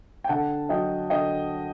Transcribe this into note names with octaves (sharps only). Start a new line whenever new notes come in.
G5
D3 F#5 A5
F#3 D#5 G5
D3 D#5 G5